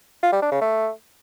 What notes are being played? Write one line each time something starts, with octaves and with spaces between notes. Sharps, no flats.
F4
G3
D4
C#3
A3